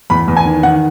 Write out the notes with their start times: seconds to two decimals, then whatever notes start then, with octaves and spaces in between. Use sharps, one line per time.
0.10 E2 B5
0.28 E2
0.37 G#5
0.46 D#3
0.63 D#3 F#5